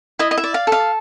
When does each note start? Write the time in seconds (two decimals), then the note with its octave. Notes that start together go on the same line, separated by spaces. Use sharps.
0.19 E4 D#5
0.31 D#5
0.37 E5
0.44 D5
0.54 F5
0.67 A4
0.72 F5